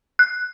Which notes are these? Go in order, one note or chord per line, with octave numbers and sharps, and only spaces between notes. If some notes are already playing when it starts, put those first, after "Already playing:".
F#6